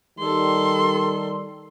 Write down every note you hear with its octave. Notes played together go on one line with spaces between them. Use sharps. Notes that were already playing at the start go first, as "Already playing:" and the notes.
D#3 G3 A4 C6